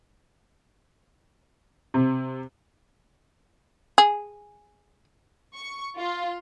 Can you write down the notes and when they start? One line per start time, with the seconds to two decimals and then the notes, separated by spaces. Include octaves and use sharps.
1.94 C3
3.98 G#4
5.53 C#6
5.99 F4